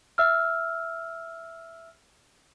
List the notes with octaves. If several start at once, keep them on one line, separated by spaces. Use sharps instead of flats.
E5 E6 F6